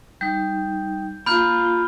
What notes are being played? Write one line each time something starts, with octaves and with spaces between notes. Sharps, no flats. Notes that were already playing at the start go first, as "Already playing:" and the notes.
G3 D#4 G6
A#3 F4 B5 F6 G6